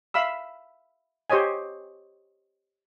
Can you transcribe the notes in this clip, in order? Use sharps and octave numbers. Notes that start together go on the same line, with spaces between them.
E5 F5 B5 E6
G4 C5 C#5 D#5 G#5